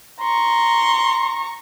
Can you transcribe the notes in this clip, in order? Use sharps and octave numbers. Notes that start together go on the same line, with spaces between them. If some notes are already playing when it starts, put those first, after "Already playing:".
A#5 C6 C#6